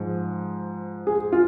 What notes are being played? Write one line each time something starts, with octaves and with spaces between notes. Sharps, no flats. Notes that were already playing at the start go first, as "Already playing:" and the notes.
Already playing: G#2 F3 G#3
G#4
F4